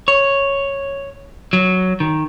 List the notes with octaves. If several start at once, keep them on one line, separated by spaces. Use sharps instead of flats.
C#5
F#3
D#3